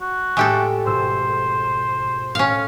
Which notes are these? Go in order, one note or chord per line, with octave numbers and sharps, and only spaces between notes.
F#4
A2 G#3 G4 A4 E5 C#6
G#1 B2 C5 E6
A2 C#4 F5